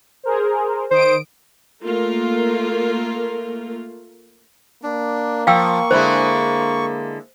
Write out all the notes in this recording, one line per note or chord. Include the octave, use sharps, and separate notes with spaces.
G#4 A#4 C5
D#3 C5 D#6 D7
A3 A#3 F4 A#4
A#3 D4
F3 F5 G5 C#6 E6
D3 G#3 E4 C5